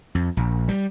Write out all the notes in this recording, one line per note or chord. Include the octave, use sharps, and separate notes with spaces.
F2
A#1
G3